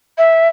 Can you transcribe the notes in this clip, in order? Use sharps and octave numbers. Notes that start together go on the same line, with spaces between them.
E5